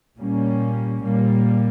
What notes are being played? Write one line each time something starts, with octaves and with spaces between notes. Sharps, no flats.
A#2 G3 A#3 C#4
A#2 G3 A#3